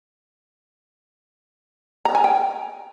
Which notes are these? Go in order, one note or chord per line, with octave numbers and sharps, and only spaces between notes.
A#5
G#5
G5